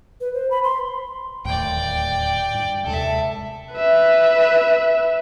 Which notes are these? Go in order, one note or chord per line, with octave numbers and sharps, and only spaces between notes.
B4
C5
B5
C6
D1 D#2 A2 D5 G5
G2
D#2 C3 G#3 A4 E5
B4 E5